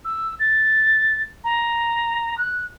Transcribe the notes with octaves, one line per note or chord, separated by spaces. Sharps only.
E6
A6
A#5
F#6